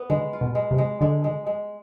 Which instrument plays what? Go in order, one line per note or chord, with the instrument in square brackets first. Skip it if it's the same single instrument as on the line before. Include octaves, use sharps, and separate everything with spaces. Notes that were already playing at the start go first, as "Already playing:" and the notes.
Already playing: [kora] B3
[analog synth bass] D3 [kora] G#3
[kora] F4
[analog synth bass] B2
[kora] G#3
[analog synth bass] C3
[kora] G#3
[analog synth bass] D3 [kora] G#3
[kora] G#3
G#3